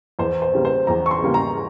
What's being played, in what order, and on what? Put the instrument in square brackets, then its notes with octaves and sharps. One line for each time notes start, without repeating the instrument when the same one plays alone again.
[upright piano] E2 C5
C5
C#3 G3 A#3
C5
E2 A#5
C#6
C6
C#3 G3 A#3
A#5